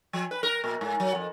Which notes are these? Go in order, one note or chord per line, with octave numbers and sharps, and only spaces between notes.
F3
B4
A#4
A#2
G#2
F#3
F2